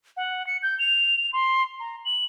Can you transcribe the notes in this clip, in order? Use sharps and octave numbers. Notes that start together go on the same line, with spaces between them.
F#5
C#7
G6
F7
C6
A#5
F#7